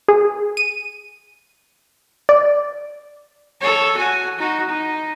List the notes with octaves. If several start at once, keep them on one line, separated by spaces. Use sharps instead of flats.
G#4
D#7
D5
A4 C#5
F#4 G#5
D#4 F#4
D#4